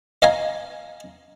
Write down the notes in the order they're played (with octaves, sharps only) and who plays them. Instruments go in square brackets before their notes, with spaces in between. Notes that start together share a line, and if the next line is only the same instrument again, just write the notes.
[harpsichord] D#5 F5 G#5 A#5